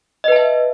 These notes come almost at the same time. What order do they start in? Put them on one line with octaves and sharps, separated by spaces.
D#5 B4 A5 E5